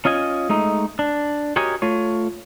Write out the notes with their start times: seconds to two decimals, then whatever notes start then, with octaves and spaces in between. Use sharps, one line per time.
0.05 C#4 F4 D#5 G#5
0.49 G#3 A3 D#4
0.99 D4
1.56 F#4 G4 A#4 C#5 D#5 G#5
1.82 A3 F4 C#5